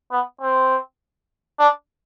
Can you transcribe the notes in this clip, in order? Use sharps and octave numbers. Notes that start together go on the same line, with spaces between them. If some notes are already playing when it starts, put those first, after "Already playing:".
B3
C4
D4